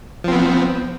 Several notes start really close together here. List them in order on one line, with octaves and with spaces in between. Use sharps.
F3 C4 B3